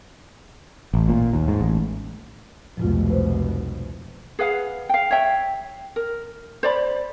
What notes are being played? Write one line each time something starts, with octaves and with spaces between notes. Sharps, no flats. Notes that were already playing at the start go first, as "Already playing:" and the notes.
A1
A#2
D#2
G#2
A1
F1 C2 B2 F3 G#3 F4
B4 C5
G#4 B4 F5 F#5
F5 G5
C#5 E5 G5
A#4
C5 D5 B5